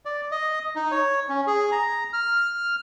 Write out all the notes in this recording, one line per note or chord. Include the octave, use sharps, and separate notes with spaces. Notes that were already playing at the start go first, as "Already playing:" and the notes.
D5
D#5
D#4
C#5
C#4
G#4
A#5
F6